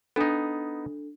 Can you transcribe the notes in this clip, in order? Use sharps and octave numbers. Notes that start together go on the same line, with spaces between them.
B3 D4 D#4 A4